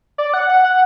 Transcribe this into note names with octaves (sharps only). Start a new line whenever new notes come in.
D5
F#5
F#5
F#5